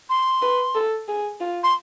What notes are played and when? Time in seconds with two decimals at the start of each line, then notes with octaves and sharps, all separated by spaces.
0.09 C6
0.42 B4
0.75 A4
1.08 G#4
1.41 F4
1.63 C6